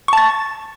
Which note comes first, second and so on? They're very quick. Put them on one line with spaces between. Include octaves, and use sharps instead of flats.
C#6 A5 A6